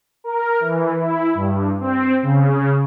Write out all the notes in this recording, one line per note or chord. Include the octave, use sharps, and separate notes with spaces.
A#4
E3
E4
G2
C4
C#3